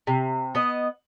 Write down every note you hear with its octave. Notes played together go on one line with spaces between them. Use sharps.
C3
B3 D#5